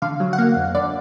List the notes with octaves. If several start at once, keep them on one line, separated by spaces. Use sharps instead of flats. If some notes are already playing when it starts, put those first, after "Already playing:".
D3 F5
F#3
F#5
A#3 F5
F2
D3 D5